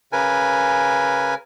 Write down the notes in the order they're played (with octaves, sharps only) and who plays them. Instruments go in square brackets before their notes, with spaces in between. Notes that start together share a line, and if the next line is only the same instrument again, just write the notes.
[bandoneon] C#3 A#4 B4 G#5